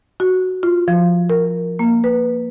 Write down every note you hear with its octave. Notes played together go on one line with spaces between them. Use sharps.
F#4
F4
F3
A#4
A#3
B4